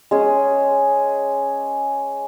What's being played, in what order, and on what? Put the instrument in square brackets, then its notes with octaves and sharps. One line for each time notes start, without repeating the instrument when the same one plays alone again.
[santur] G#3 C#4 G#4